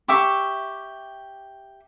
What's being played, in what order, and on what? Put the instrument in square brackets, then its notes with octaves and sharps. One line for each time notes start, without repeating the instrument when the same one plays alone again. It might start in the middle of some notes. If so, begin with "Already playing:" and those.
[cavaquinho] G4 E5 C#6 [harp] D6